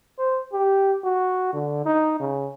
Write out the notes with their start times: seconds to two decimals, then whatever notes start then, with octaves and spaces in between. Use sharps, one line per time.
0.19 C5
0.53 G4
1.04 F#4
1.53 D3
1.86 D#4
2.20 C#3